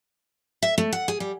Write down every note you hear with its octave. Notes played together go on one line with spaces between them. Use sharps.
E5
A3
F#5
G#4
G3